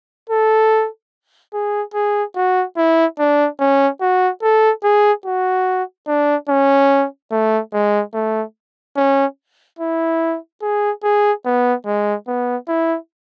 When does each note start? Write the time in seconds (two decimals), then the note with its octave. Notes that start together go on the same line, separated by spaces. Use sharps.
0.30 A4
1.53 G#4
1.94 G#4
2.36 F#4
2.77 E4
3.19 D4
3.59 C#4
4.01 F#4
4.42 A4
4.84 G#4
5.25 F#4
6.07 D4
6.49 C#4
7.31 A3
7.73 G#3
8.14 A3
8.97 C#4
9.79 E4
10.62 G#4
11.03 G#4
11.45 B3
11.86 G#3
12.28 B3
12.68 E4